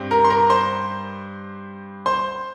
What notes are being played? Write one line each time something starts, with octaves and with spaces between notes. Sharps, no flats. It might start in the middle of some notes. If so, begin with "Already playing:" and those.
Already playing: G2 G3 C4
A#4 A#5
C6
A#4 A#5
C5 C6
C5 C6